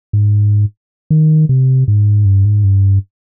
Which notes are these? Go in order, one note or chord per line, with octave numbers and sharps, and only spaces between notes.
G#2
D#3
C3
G#2
G2
G#2
G2